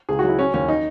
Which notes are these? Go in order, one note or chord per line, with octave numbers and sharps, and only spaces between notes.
C#2 G#4
F#3 F#4
E4
F#3 C#4
D#2 C#4
D#4